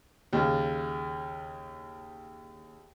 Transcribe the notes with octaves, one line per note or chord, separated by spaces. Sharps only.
D#2 C#3